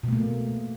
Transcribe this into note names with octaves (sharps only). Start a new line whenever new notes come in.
B2 A3 A#3